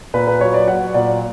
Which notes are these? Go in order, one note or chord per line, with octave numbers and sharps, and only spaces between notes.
A#2 B4
B4
F#3 C#5
D5
F#3 F#5
A#2 D5